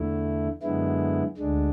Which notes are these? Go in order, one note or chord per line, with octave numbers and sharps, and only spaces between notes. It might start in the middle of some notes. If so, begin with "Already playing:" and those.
Already playing: E2 D3 A3 E4
F#2 D3 G#3 B3 E4
D2 D3 G#3 D4